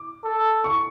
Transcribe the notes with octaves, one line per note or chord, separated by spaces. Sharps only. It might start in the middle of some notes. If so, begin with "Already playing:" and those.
Already playing: D6
A4
C#6